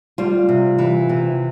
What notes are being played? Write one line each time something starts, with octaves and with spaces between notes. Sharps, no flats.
G3 F4
C3
E3
C3